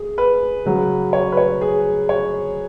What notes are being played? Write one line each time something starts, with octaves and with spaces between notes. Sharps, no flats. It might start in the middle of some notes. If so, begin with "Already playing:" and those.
Already playing: G#4
B4
C#3 F#3
C#5
B4
C#5
G#4
C#5